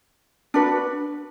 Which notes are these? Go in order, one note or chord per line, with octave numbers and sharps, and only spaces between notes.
D4 F#4 B4